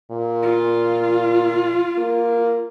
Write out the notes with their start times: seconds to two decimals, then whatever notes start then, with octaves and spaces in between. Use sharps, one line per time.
0.11 A#2
0.43 F4
1.98 A#3